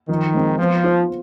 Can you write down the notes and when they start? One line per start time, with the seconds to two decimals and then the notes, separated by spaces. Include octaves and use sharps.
0.09 D#3 F3
0.34 G#3 C4
0.58 F3 B3
0.84 F4 C5